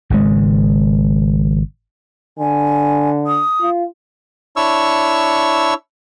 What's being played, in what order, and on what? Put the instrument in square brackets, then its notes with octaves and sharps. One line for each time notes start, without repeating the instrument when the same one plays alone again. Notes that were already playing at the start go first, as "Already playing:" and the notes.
[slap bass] G#1 C#3 G#3
[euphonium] D3 [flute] G#5
[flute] D#6
[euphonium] F4
[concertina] D4 E4 C#5 C#6 E6